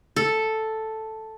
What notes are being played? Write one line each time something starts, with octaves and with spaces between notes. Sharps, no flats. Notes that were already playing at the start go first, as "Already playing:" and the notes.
A4